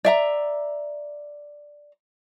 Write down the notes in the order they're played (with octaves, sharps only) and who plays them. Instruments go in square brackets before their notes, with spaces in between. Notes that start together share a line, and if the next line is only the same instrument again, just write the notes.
[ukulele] D5 E5 A#5